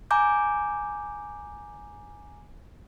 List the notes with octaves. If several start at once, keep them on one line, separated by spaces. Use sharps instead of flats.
G#5 A#5 D6 G6